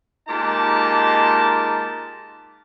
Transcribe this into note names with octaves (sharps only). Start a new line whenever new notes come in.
A#2 G#3 D#4 G4 A5